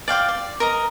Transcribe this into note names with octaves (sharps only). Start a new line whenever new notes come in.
D5 F5 G5 D6
D5
A#4 D#5 A#5